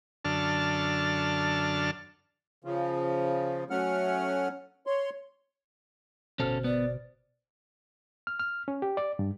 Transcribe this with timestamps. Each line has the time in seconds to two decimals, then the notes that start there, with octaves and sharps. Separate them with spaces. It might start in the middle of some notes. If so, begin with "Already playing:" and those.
0.25 F#2 D3 D4 A4 A5 F6
2.64 C#3 F3
3.70 F#3 A3 C#4 F#5 F6
4.86 C#5 C6
6.39 G1 B2 C#4 A4 C5 F6
6.64 B3 D5
8.27 F6
8.40 F6
8.68 C#4
8.82 G4
8.97 D5
9.19 G2